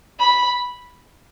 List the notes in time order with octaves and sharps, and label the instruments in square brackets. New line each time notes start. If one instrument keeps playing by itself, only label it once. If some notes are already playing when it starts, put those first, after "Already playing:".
[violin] B5